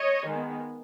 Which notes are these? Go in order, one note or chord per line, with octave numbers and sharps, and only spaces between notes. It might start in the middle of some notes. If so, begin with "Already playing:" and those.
Already playing: C#5 D#5
D#3 G#3 B3